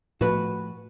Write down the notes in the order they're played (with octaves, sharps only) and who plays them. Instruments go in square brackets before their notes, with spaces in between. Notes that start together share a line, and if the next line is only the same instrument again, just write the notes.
[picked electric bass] A2 F3 A3 [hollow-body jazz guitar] F#4 B4